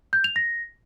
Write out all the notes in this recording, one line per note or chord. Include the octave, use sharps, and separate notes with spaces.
G6
F7
A#6